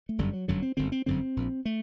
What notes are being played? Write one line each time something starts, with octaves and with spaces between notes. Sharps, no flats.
A3
G1 F#2 D3 G3
F#3
G1 F#2 D3 F#3
C4
G1 F#2 D3 C4
C4
G1 F#2 D3 C4
A#1 A#2
A3